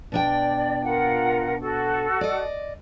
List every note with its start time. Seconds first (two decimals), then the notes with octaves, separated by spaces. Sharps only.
0.12 B2 D4 D5 G5
0.83 F4 A#4 F#5
1.59 F#4 A4
2.21 D5 D#5